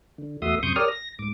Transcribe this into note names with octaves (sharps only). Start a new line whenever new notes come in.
D3
E2 A3 F#4 E5 C6 D#6
F#2 C3 C6 C#6 D#6 G6
G4 A#4 C#5 D5 D#6 F6
A#6
G#2 D6